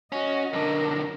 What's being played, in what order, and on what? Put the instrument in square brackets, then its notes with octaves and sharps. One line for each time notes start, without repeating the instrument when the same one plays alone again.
[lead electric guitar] C#4 [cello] F#4 D#5
[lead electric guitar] B1 D3 [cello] A#4